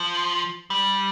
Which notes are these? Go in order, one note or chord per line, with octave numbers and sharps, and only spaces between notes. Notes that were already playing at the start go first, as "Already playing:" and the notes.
Already playing: F3
G3